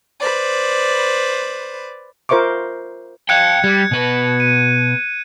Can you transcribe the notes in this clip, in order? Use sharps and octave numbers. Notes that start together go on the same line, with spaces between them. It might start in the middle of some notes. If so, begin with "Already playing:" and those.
B4 C5 D5
F4 A#4 C5 E5 C#6 D6
F5 G5 F#6 G#6 C#7
G3 G#6
B2 B4
D#7